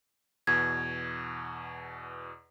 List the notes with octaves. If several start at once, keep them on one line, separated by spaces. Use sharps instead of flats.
E2 B2 G#6